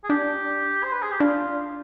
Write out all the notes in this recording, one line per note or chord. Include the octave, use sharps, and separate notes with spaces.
G#4
D4 G4
C5
B4
G#4
G4
D4 F4